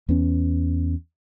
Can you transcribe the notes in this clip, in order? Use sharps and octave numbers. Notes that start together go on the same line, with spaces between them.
E2 B3 C#4